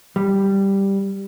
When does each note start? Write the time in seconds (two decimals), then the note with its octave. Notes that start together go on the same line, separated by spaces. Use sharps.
0.16 G3